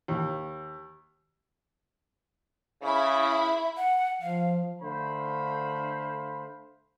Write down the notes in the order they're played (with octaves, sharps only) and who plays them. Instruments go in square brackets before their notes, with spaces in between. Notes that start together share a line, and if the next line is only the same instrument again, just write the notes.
[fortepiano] D#2
[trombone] C#3 [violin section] E4 B5
[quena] F#5
[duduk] F3 [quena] F5
[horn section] D3 A3 C5 F5 B5